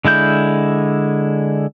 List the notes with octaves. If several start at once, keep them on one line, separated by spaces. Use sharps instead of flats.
D3 G#3 E4 G6